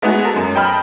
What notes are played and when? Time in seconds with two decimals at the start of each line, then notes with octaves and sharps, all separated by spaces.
0.02 G#3 A3 B3 D#4 F#4 G#4
0.25 A4 A#4
0.36 F#2
0.55 D#5 G5 A5 B5 F6